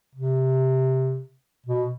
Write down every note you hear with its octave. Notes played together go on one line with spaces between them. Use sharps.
C3
B2